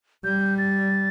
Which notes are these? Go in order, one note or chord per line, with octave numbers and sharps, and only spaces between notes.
G3 G6
A6